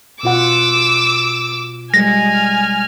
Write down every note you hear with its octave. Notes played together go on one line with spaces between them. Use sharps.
B2 F4 F#5 D6 E6
G3 G#3 G#5 F6 A#6